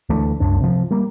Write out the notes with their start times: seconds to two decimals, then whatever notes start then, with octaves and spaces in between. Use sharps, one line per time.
0.09 D2 E3 A3 D4
0.40 C2 F#2 D4
0.60 C3 F3
0.91 G3 A#3